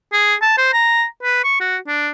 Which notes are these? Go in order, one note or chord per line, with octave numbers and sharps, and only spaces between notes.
G#4
A5
C5
A#5
B4
C#6
F#4
D4